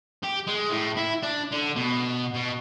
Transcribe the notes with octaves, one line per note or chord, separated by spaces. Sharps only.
G4
G#3
A2
E4
D4
D3
B2
B2